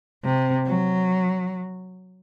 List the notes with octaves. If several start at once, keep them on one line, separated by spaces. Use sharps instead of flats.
C3
F#3